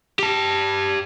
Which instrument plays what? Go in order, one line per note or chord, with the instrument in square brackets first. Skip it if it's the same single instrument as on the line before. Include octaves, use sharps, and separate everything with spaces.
[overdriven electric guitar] G4 A5